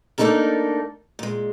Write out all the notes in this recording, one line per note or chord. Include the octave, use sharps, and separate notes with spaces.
A3 A#3 D4 D#4 A4 A#4
A#2 G#3